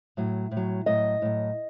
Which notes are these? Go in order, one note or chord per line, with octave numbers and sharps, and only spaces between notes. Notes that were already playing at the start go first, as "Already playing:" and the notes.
A2 F#3
A2
F#3
A2 F#3 D#5
A2 F#3